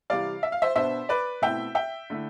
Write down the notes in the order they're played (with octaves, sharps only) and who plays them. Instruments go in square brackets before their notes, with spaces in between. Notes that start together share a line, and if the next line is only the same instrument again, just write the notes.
[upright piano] C3 E3 G3 D5 F5
E5
F5
C5 E5
B2 B3 D4 C5 E5
B4 D5
B2 A3 C4 E4 E5 G5
E5 G5
D3 A3 E4